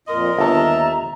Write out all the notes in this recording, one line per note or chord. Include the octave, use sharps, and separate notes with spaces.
F2 A#2 A#4 D#5 C6
G1 D#2 A4 E5 A5 A#5